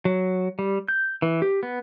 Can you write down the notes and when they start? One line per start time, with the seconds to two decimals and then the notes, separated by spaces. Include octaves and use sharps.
0.05 F#3
0.59 G3
0.88 G6
1.22 E3
1.42 G4
1.63 B3